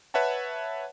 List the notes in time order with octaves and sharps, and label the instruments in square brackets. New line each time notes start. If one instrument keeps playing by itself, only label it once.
[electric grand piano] B4 C#5 E5 F#5 A5